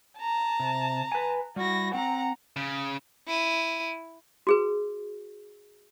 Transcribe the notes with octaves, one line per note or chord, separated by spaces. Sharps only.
A5 A#5
C3
B4 G#5
G3 E4 F#4 A#6
C4 F#5 A#5
C#3
E4 D#7
F#4 G#4 B4